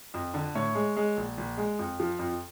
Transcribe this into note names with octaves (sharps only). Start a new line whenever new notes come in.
F2
D3
A2 C#5
G#3
G#3
A#1
A#1
G#3
F2
F3
F2